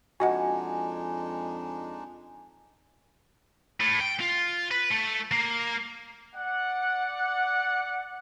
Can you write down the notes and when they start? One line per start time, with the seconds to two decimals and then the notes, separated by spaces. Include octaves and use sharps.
0.20 F2 G#3 D4 D#4 F#4 D#5 F#5 G#5
3.80 A2
4.00 G5
4.20 F4
4.71 B4
4.92 A3
5.32 A#3
6.35 D5 F#5